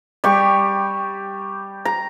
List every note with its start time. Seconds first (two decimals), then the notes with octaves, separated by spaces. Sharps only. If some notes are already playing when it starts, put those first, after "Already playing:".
0.24 G3 G4 C#6
1.85 A#5